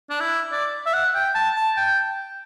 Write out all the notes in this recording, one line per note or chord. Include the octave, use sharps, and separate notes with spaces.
D4
E4
D5
E5
F#5
G5
A5
A5
G5